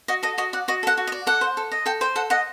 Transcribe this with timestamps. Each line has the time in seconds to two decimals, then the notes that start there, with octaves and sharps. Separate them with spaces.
0.08 F#4 D#5
0.23 A4 D#5
0.38 F#4 D#5
0.53 D5 F#5
0.68 F#4 D#5
0.83 A4 F#5
0.97 F#4
1.07 D#5
1.12 D5
1.27 A4 F#5
1.41 C5
1.57 A4
1.72 D#5
1.86 A4 G5
2.01 C5 G5
2.16 A4 F#5
2.30 D#5 F#5